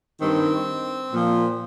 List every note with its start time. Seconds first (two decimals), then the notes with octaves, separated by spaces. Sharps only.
0.19 G2 D#3 C4
1.13 A#2 F3